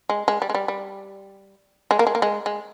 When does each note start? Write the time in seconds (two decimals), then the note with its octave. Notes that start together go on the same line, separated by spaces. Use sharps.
0.09 G#3
0.28 G#3
0.42 G3
0.50 G#3
0.55 G3
0.68 G3
1.91 G#3
1.99 A#3
2.07 G#3
2.15 A#3
2.22 G#3
2.46 G#3